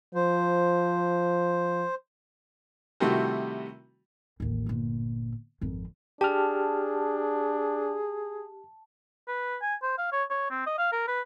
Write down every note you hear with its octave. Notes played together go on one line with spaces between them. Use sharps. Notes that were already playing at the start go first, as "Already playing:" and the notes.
F3 C5
C3 D#3 G3 A3 E4 F#4
A1 D#2
G1 A#2
G#1 F2
D4 G4 G#4 A5 F6
B4
G#5
C5
F5
C#5
C#5
C4
D#5
F5
A#4
B4